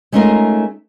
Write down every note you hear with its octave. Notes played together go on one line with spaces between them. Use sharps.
G#3 A3 C#4 D#4 F4 A#4